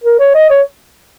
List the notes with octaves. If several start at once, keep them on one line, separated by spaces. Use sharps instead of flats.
A#4
C#5
D#5
C#5